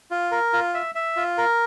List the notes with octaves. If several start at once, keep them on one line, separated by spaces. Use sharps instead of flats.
F4
A#4
F4
E5
E5
F4
A#4